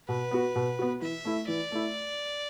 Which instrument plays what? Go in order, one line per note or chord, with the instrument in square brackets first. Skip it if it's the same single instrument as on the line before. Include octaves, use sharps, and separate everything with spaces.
[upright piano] B2 [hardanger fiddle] B4
[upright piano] B3 F#4
B2
B3 F#4
[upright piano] E3 [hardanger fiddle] E5
[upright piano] A3 E4
[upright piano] E3 [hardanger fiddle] D5
[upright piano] A3 E4